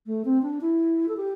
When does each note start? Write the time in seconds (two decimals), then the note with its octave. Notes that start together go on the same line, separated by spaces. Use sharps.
0.06 A3
0.25 C4
0.42 D4
0.61 E4
1.08 A4
1.17 G4